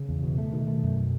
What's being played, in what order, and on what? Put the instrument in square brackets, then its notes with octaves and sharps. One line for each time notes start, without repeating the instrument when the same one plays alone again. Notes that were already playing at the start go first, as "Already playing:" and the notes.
Already playing: [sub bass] C#3
[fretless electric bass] E2
B2
A3
[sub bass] B2 [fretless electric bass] D#3
[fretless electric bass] A3
F#2